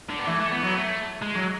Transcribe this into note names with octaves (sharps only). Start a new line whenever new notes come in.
D3
B3
E3 A3
A3
B3
F#3
A3
G#3
F#3